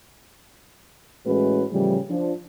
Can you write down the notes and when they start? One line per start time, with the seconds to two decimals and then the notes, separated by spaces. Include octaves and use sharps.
1.27 A2 E3 G#3 C#4 F#4 B4
1.72 A2 C#3 E3 F3 G3
2.11 F3 D4